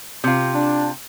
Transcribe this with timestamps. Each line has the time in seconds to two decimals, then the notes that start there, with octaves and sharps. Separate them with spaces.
0.24 C3 F4
0.55 D4